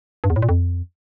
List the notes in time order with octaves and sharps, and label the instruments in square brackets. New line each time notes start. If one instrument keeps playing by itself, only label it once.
[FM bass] G2
E2
A2
A#2
F2